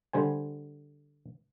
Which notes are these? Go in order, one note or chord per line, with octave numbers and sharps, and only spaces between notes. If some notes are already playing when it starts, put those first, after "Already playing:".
D3 G3 C5 G#5